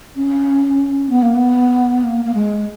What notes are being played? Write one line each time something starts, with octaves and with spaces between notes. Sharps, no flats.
C#4
B3
A#3
B3
A#3
A#3
G#3